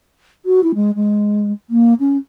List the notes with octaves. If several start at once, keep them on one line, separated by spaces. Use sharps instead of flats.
F#4
E4
G#3
G#3
A#3
C#4